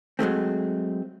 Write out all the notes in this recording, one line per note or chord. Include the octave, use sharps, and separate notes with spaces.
F#3 G#3 A3 C4